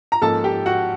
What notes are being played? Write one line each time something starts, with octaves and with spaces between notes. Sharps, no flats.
A#5
G#2 F3 A#3 C#4 A4 A5
G4 G5
F#4 F#5